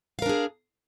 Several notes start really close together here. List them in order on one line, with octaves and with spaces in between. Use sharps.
F5 A#4 D4 G#4